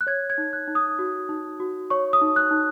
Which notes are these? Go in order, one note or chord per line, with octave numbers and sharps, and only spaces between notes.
F#6
C#5 G#6
G#6
D#4
F#6
D#4
D#6
F#4
D#4
F#4
C#5 C#6
D#6
D#4
F#6
D#4